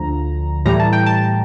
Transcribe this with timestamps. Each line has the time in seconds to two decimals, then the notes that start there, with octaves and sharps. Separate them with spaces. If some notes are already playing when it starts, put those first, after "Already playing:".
Already playing: D2 D3 F3 A#5
0.65 A2 E3 G3 A#5
0.80 A5
0.93 G5
1.06 A5